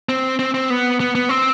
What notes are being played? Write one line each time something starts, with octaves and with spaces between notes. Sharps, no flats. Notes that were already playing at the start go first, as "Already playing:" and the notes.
C4
C4
C4
B3
B3
B3
C4